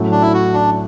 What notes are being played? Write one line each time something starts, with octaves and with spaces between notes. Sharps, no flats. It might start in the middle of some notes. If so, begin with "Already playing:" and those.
Already playing: A2 F#3 A3 C#4
D4
E4
F#4
D4